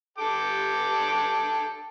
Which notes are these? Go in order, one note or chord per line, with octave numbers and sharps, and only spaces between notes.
A4 G5 D6